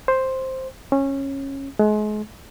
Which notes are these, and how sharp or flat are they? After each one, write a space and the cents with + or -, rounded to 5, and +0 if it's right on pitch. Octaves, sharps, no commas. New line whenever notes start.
C5 +5
C#4 -20
G#3 +35